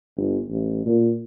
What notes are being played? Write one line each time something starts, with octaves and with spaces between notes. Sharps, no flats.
G1
A1
A#2